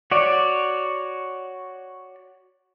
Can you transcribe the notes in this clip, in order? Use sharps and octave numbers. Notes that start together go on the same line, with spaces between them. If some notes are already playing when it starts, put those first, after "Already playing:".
F#4 C#5 D5